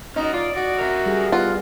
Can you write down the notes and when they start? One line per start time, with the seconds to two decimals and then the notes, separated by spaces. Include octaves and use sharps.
0.16 C#4 D#4 F#4 D#5
0.33 F4 D5
0.56 F#4 D5
0.79 A#4 E5
1.06 G3 G#4
1.32 B3 F4 F#5